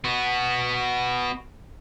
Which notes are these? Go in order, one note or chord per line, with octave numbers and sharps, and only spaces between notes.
B3 F#4